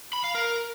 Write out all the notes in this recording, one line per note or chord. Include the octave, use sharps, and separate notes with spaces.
B5
F5
A#4